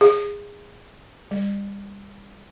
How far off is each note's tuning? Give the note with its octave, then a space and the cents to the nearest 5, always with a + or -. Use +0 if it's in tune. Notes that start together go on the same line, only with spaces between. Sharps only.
G#4 -20
G3 +35